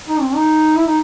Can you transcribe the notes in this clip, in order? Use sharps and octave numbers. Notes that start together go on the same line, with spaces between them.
D#4
C4
D#4
E4
D#4